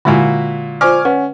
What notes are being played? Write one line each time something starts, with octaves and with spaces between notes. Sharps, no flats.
A#2 D3 G#3 E4 F#4 G#5
F4 C5 D5 G#5 C#6 D6 F6
C#4 B4 F#5